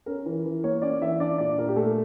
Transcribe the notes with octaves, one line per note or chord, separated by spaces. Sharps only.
C#4 A#4
E3
E3
A#3 C#5
C#4 D5
E3 E5
D4 D5
A#2 D5
A#2 A#4
G4
A3 A4